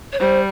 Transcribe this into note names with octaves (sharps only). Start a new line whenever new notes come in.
C#5
G3 C5